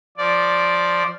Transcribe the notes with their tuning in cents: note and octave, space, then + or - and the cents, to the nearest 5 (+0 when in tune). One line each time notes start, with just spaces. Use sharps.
F3 +0 D5 -5